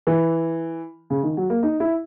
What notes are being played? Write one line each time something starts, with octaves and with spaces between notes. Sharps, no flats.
E3
C#3
D#3
F#3
A#3
D#4
E4